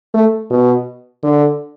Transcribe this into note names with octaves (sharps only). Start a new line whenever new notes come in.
A3
B2
D3